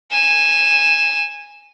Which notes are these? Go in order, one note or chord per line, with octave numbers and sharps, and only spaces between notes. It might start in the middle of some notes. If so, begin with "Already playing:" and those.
G#5 E7